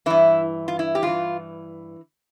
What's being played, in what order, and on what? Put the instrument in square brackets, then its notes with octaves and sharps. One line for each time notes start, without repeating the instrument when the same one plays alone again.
[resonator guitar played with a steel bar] G2 E3 E4
F4
E4
G4
G2 E3 F4